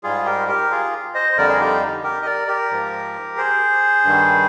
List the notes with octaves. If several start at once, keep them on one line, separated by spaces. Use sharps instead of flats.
G#2 G3 F4 G#4
G4 A#4
G4 A#4
F4 G#4
C5 D#5
C5
F2 D3 G3 A#4 D5
G#4
D#4 G4
G4 A#4
D#5
A#4 D5
G4 A#4
G#2 F3
G#4 C5
G2 D#3 G3